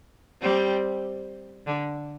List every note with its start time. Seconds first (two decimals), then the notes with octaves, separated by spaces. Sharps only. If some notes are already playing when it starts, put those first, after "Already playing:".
0.42 G3 C4
1.67 D3